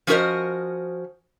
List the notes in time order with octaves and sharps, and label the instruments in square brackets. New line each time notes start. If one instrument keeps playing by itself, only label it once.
[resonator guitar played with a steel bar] F3 C#4 F#4 A#4 C5 D#5